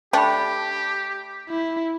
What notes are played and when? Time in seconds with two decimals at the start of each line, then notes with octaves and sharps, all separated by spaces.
0.13 A3 D4 G4 G5 B5
1.49 E4